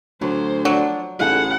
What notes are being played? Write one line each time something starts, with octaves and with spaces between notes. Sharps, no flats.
D2 F#3 C5
F3 F#3 D4
A1 D#4 G#4 A4 F#5